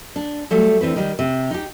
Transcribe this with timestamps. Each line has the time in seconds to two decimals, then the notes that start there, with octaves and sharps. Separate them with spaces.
0.16 D4
0.51 F#3 G3 A3
0.81 D2 E3 C4 B4
0.96 D#3 G3
1.19 C3
1.51 D#4 G4